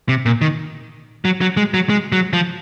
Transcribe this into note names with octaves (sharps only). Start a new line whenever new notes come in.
C3
A#2
D#3
F#3
F#3
G#3
F#3
G#3
F#3
F3